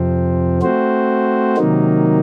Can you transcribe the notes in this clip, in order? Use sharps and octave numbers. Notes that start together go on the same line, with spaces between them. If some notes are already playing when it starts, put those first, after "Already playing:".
Already playing: F2 C3 F3 C4
A3 C4 F#4 C5
C3 D#3 F#3 A#3 D#4